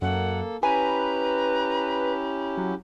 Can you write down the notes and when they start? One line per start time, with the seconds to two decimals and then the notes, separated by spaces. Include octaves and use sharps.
0.02 F#2 A#3 A4 F#5
0.63 C#4 E4 G4 B4 G#5 A#5
2.57 F#3